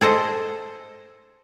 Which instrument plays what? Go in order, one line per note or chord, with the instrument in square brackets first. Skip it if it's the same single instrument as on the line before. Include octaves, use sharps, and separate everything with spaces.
[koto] G#4 A4 C5 D#5